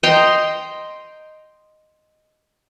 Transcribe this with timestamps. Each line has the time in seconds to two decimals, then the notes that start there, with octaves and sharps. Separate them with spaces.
0.03 D#5 G5 A#5 C6